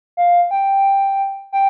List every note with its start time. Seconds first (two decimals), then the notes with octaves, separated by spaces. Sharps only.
0.17 F5
0.51 G5
1.52 G5